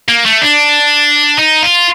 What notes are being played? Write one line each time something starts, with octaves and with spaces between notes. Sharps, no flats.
A#3
A3
D4
D#4
F4